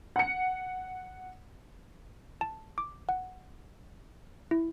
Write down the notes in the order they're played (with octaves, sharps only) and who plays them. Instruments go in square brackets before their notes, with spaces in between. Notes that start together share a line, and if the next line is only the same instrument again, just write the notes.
[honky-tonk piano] F#5 C#7
[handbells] A5
D6
F#5
E4